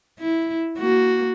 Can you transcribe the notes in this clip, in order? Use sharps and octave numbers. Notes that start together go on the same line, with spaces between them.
E4
A#3 F#4